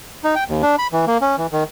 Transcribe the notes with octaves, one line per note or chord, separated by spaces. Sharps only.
D#4
G5
D#2
D4
B5
E3
A#3
C#4
E3
D#3